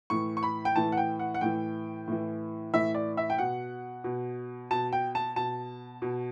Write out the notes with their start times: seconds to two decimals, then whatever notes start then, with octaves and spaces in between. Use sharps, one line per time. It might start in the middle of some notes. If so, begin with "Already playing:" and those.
0.10 A2 E3 C#6
0.37 C#6
0.43 B5
0.65 G5
0.76 A2 E3 A5
0.92 F#5
0.97 G5
1.19 F#5
1.34 F#5
1.41 A2 E3 G5
2.08 A2 E3
2.73 A2 E3 E5
2.94 D5
3.17 E5
3.30 G5
3.38 B2 F#5
4.04 B2
4.71 B2 A5
4.93 G5
5.15 A5
5.36 B2 A5
6.02 B2